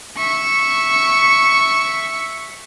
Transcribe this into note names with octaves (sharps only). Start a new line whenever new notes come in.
E5 C#6